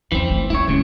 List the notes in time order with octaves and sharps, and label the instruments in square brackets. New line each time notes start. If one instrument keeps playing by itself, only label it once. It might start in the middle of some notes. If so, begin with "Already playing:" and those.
[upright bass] E2 F3 [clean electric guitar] E3 C4
[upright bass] G1 A3
[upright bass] C4 C#4 [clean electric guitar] E4 C#5
[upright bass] D1 [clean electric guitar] D#2 G#2 C#3